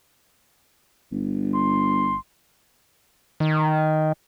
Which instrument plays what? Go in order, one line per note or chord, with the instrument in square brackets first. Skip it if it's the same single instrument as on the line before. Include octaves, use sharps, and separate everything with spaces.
[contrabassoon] G1
[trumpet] C6
[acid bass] D#3